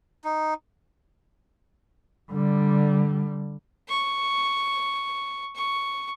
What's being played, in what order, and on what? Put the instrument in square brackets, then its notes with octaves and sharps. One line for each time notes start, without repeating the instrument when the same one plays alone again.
[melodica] D#4
[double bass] D3 G3
[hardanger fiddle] C#6
C#6